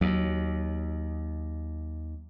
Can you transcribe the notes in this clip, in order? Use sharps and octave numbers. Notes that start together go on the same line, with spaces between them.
D#2 F#3